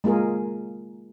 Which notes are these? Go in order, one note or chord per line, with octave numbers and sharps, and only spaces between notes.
G#3 A#3 F4 G#4 A#4